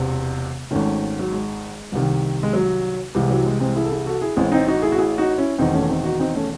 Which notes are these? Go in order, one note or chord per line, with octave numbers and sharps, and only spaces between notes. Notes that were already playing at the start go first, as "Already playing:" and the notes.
Already playing: E1 E2 C3 C4
G#1 G#2 D#3 A3 C#4
F#3
G#3
C2 C3 D#3
G#3
F#3
C2 C3 E3 G#3
F#3
G#3
G#3 C4
E4 G#4
A4
E4 G#4
F#4 A4
E4 G#4
A1 A2 E3 G#3 C4
C4 D#4
D#4 F#4
E4 G#4
F#4
E4 G#4
D#4 F#4
C#4 E4
E1 E2 D#3 C4 D#4
A3 C#4
C4 D#4
D#4 F#4
C4 D#4
A3 C#4